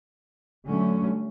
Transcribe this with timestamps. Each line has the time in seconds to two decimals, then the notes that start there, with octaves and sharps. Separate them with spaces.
0.67 D3 F#3 A3 C#4